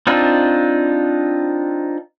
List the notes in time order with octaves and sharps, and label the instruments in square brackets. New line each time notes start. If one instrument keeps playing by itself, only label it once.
[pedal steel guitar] C4 D4 D#4 F4